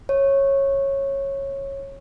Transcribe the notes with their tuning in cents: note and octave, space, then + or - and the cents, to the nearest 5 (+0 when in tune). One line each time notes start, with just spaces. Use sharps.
C#5 -15